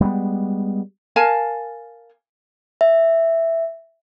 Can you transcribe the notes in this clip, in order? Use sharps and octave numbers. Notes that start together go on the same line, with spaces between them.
G3 G#3 A#3 B3
A#4 F5 G#5 A5
E5